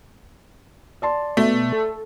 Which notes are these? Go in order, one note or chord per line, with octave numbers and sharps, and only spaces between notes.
D5 A5 C6
B2 A3
A4